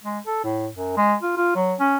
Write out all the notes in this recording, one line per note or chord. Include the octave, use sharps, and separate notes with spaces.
G#3
A4
A2
F#2
G#3
F4
F4
F#3
C#4